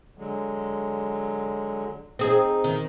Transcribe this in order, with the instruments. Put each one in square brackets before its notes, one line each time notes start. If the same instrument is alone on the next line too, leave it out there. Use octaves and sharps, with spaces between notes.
[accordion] D3 F#3 G#3
[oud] C4 G#4 [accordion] D#4
[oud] D#3